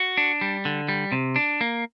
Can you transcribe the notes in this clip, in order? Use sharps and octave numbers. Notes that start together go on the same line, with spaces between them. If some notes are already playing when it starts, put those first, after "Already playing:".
Already playing: F#4
D4
G3
D3
G3
C3
D4
A#3